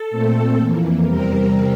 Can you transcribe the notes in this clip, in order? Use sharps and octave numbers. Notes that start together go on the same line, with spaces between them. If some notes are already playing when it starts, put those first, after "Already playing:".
Already playing: A4
A#2 A3 C4
F2 E3 A#3
E2 C3 G3 C4 A#4